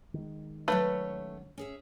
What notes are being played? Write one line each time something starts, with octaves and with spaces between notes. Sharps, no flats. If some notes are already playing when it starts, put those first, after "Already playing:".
D#3 G#3
F#3 A3 C#4 B4 C#5
C#4 G#4 E5